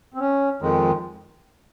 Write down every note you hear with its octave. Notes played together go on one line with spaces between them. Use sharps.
C4
C#4
F2 D#3 G#3